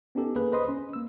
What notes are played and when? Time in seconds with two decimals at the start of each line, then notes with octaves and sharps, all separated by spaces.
0.15 B3 C#4 D#4 G4 A4
0.35 A#3 G#4 B4 F#6
0.52 B4 C5 D#5 B5 C6 D#6
0.68 C#4
0.93 A#3 E6